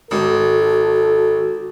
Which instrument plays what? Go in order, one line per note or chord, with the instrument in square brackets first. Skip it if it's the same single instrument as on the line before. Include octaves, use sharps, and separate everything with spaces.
[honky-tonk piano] G#1 [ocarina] F#4 [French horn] A4